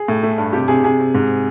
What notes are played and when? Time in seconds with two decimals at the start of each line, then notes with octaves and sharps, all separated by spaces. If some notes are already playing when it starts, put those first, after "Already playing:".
Already playing: G#4
0.08 A2
0.23 A3
0.38 G2
0.53 C3 G4
0.68 C3 G#4
0.84 C3 G#4
0.99 C3
1.15 G#2